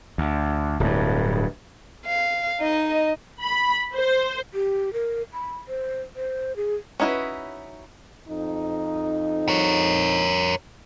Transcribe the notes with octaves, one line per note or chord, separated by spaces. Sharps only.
D2
D1 G2
F5
D#4 D#5
B5
C5
G4
A#4
B5
C5
C5
G#4
C#4 D#4 E4 F#4 B4
F2 D#4
A#4 C#5